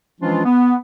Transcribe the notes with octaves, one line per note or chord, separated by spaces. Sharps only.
E3 F3 G#3 C#4 D4 F4
B3